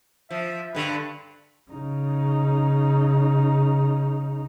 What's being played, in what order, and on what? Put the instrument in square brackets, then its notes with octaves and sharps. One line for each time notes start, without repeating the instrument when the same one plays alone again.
[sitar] F3 [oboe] E5
[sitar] G2 D3 [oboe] B4
[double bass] C#3 D#4